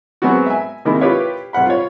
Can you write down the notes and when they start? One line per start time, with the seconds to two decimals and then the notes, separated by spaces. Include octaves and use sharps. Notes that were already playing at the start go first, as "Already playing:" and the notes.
0.22 F#3 G#3 B3 C4 F#4
0.46 E5 G#5
0.85 C3 D#3 G#3 A#3 E4
1.01 E4 F4 G4 B4 C#5 F5
1.53 C2 C5 F#5 B5
1.66 F4 C#5